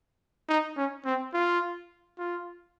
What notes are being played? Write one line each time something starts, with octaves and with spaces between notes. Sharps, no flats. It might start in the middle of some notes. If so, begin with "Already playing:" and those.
D#4
C#4
C4
F4
F4